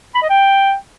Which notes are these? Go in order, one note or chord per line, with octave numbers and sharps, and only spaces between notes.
B5
D#5
G5